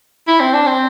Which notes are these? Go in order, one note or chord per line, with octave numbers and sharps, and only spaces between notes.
E4
C4
D4
C4